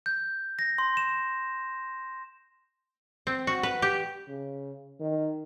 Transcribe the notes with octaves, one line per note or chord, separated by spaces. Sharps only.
G6
A#6
C6
E7
C4
F#4
B4
G4
C#3
D#3